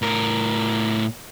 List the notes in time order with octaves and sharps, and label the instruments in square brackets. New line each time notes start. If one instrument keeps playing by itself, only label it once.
[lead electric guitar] A2 A#4